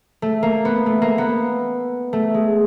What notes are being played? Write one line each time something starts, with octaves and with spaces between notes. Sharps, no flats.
A3
A#3
B3
A3
A#3
B3
A3
G#3